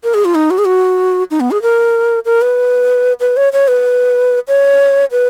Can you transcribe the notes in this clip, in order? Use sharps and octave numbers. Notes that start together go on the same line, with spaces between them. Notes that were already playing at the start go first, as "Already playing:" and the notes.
A#4
G#4
F4
D#4
F#4
G#4
F#4
D#4
B3
G#4
A#4
A#4
B4
B4
C#5
C#5
B4
C#5
B4